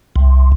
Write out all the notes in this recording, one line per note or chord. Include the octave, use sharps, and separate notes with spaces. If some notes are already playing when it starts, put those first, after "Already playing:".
C2